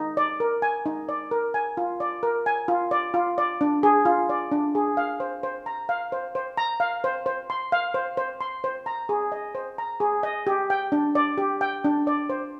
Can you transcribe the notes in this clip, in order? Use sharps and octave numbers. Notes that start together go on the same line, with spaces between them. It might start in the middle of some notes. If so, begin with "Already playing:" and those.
Already playing: D#4
D5
A#4
G#5
D#4
D5
A#4
G#5
F4
D5
A#4
G#5
F4
D5
F4
D5
D4
G#4
F4
D5
D4
G#4
F5
C5
C5
A#5
F5
C5
C5
A#5
F5
C5
C5
C6
F5
C5
C5
C6
C5
A#5
G#4
D#5
C5
A#5
G#4
D#5
G4
G5
D4
D5
G4
G5
D4
D5
C5